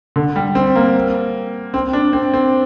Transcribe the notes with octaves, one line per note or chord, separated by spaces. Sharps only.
D3
G3
C4
A#3
C4
D4
C4
C4